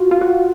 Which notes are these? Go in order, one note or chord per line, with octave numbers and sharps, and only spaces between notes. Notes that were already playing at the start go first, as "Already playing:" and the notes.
Already playing: F4 F#4
F4
F#4